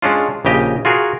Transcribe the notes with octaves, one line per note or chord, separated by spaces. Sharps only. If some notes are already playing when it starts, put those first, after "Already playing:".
G#3 C#4 D4 F4
A#1 C#3 G4 D#5
F4 F#4 G#4 A#4